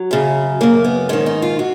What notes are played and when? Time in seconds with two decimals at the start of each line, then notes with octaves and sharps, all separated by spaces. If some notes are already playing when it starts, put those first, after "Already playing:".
Already playing: F#3
0.11 F#2 C#3
0.61 F#2 C#3 A#3
0.84 B3
1.09 G#2 D#3 C#4
1.26 D#4
1.42 F4
1.59 F#4